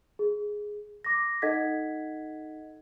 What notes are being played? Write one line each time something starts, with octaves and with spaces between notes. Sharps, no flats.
G#4
D6 A#6
D#4 A4 D#5 F#5 G#6 B6